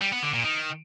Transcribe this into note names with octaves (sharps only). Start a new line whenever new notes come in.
G3
B3
D3
A#2
D#3